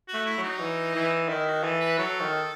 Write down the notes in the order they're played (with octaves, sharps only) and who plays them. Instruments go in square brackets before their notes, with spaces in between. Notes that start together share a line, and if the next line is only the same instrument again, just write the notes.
[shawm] F#4
[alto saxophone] A3
[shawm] E4
[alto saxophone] F#3
[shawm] D#4
[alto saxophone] E3
E3
[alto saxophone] D#3 [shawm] E4
[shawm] F#4
[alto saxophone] E3 [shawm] A4
[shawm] B4
[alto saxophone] F#3 [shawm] A4
[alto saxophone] D#3